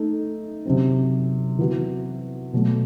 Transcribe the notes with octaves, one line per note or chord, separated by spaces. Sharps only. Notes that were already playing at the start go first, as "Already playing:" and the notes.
Already playing: A3 D#4 A4
C3 F#3 C4
E3 B3 F#4
B2 F#3 A3